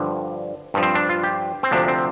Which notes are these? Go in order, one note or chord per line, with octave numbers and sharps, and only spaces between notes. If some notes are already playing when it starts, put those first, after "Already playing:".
Already playing: G2 D3 F3
G2 F3
C4
D4
F4
G4
C4
D2 C3 F3 D4
C4